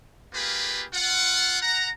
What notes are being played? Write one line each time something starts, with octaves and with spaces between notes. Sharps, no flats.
A#3 F4 G4 G#4 B4
F4 F#5
F#5 A#5